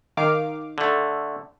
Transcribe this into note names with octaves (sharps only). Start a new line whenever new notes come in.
D#3 F5 D6
D3 A3